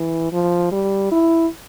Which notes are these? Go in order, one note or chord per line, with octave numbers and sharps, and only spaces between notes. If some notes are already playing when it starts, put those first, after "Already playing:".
Already playing: E3
F3
G3
E4